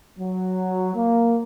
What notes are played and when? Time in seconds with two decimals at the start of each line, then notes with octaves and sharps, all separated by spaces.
0.19 F#3
0.95 A#3